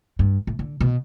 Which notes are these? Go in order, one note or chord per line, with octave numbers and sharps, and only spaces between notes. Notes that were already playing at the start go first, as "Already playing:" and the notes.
G2
A2
D3
B2